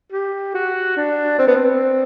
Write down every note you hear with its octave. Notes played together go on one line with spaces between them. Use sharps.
G4
F#4
D4
C4
B3
C4